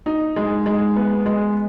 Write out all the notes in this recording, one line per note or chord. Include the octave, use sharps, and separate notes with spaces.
D#4
G#3
G#3
B3
G#3